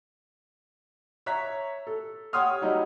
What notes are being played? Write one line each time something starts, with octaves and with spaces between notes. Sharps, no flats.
C#5 E5 A#5 F#6 B6
A4
G4 C#5 F#5 C6 D#6 F6
F#3 G3 D#4 E4 G4